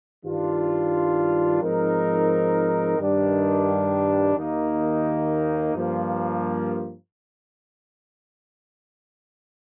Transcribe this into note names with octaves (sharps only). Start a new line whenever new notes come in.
G2 D#3 G3 D4 F4
G#2 F3 C4 D#4 A#4
G2 D#3 G3 D4
D#2 D#3 A#3 D#4
G2 F3 A#3